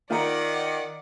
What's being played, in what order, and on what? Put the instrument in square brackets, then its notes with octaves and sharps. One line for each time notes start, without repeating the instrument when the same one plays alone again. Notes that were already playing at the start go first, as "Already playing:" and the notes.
[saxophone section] D#3 [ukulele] F4 A#5 [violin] D5 F#5